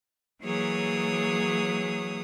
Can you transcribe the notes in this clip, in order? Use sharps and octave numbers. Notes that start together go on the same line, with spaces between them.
E3 F#3 A#3 G#4 C#5 D#6